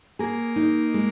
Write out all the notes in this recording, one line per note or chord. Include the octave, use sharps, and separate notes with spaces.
A#3 G#4
D#4
G#3